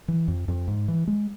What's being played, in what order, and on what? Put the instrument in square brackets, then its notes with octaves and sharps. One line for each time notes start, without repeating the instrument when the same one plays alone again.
[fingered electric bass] E3
F2
F2
G#2
E3
G#3